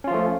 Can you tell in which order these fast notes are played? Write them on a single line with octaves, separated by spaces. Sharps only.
C#4 F4 F3 A3